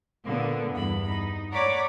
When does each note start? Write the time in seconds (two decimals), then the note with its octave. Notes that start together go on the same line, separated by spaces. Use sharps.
0.25 A#2 D3 A#3 B3
0.75 E2 G2 B3 B5
1.09 D#4
1.52 C#5 D5 F#5 A#5 B5 D6